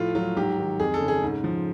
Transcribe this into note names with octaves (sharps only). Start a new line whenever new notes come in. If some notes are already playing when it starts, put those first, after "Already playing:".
Already playing: A2 F3 F4
F#3 F4
G#2 G4
D#3
F2 G#4
A4
C#3
G#4
G#2
F3